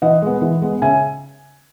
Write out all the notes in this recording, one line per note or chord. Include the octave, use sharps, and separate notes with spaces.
E3 D#5 F#5
G#3 B3
E3
G#3 B3
C#3 E5 G#5